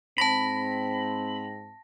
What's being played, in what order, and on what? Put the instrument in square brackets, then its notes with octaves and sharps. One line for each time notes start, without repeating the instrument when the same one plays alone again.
[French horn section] G#2 C4 [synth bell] A5 A#6 [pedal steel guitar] B5